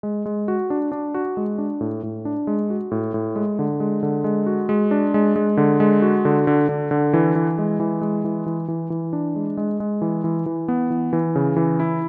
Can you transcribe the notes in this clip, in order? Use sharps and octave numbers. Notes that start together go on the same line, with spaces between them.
G#3
G#3
F#4
D4
D4
F#4
G#3
D4
A2
A2
D4
G#3
F#4
A2
A2
G#3
D3
G#3
D3
G#3
F#4
G#3
D4
G#3
G#3
D3
G#3
F#4
D3
D3
D3
D3
E3
E3
G#3
E3
G#3
E3
E3
E3
E3
D4
G#3
G#3
G#3
E3
E3
E3
B3
E3
E3
C#3
E3
E4